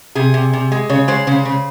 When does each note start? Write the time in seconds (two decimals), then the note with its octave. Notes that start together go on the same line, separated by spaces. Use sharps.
0.15 C3 G#4
0.34 C3
0.53 C3
0.72 G#3
0.90 C#3 C#5
1.08 G#3 C5
1.27 C#3 C5
1.45 C#3